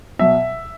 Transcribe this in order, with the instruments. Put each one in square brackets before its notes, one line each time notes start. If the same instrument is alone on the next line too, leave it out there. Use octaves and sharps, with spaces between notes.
[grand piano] B2 F#3 E5